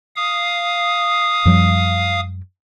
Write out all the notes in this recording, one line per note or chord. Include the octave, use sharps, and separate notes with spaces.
F5 D#6
F#2 F3 G3